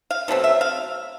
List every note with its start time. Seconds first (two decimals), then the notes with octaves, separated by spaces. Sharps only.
0.11 F5
0.28 B2 F#3 A3 C4
0.44 E5
0.61 F5